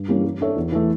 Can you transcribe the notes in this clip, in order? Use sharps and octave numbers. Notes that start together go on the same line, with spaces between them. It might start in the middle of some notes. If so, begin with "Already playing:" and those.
Already playing: G2
E3 G3 A#3 C#4
G3
D4 A4 C#5 E5
E2
E3 A3